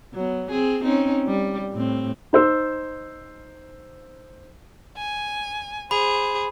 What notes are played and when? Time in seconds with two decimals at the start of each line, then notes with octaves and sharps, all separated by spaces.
0.14 F#3 B3
0.51 C4 G#4
0.84 C4 C#4 D#4
1.27 G3
1.72 A2 C4
2.33 D#4 C5 E6
4.97 G#5
5.91 G#4 C5 B5